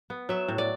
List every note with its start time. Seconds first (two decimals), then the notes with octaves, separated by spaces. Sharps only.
0.10 B3
0.29 F#3 E5
0.48 A2
0.58 D5